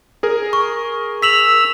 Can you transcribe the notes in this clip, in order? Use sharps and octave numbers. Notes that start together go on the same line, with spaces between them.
G#4 A#4
C#6
E6 B6 F7 F#7